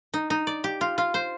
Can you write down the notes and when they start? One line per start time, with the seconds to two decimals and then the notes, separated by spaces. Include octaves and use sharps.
0.14 D#4
0.30 D#4
0.47 D5
0.64 G4
0.81 F4
0.98 F4
1.14 C5